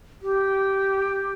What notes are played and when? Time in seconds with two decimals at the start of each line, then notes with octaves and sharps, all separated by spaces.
0.22 G4